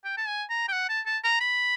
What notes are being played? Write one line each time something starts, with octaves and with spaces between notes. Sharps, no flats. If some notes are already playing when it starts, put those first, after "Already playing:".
G5
A5
G#5
A#5
G5
F#5
A5
A5
A#5
B5